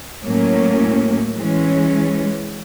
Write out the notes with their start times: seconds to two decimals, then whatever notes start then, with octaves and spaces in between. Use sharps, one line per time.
0.24 A2 F#3 A#3 C#4
1.35 E3 G#3 C#4